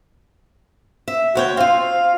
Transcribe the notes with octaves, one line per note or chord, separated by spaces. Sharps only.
E5
D2 F#4 C#5 G5
C4 F4 F5